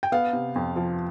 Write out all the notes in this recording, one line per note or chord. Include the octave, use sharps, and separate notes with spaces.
G5
B3 F5
C3
F2
F3